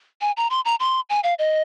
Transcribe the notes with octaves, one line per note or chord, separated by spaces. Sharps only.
G#5
A#5
C6
A#5
C6
G#5
F5
D#5